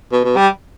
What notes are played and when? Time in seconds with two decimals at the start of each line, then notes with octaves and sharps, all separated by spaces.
0.12 B2
0.24 B2
0.37 G3